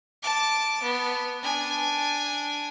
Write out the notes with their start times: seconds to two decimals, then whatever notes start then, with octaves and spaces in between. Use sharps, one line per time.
0.23 A5 D6
0.82 B3
1.43 D4 G#5